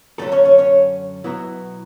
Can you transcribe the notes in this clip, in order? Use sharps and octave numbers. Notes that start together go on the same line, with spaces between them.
F#2 D3 F#3 A3 C#4 A4
C#4 C#5
C#4 C#5
C#4 C#5
B2 F#3 B3 E4